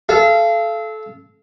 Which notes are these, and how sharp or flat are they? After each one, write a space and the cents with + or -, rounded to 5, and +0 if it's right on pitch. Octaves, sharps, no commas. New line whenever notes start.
A4 -20 F5 -35